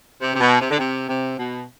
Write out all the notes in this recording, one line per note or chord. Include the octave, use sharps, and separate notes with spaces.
C3
C3
B2
C3
D3
C3
C3
B2